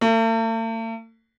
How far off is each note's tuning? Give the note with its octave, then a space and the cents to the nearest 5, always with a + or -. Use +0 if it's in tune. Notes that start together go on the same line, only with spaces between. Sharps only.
A3 +45